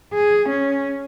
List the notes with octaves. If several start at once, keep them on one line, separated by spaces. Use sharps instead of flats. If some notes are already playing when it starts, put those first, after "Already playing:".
G#4
C#4